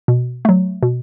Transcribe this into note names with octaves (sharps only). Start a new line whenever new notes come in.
B2
F#3 A3
B2